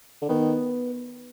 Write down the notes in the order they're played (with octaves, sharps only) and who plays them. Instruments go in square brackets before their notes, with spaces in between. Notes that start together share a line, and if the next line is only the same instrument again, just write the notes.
[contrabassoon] D3
[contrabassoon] D#3 [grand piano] B3